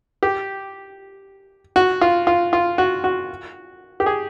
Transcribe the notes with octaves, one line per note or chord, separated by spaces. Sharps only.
G4
F#4
F4
F4
F4
F#4
F#4
G4
G#4